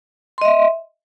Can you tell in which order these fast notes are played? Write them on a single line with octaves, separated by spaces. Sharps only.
C6 D#5 E5